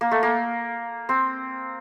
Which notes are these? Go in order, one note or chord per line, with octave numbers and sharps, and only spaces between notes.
A#3
A3
A#3
C4